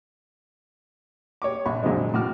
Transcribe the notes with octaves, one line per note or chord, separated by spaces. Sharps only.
G4 C#5 C#6 D6
A#1 B5 C#6
F#2 A#2 D3 F3 G#3
A2 F#4 D6 F6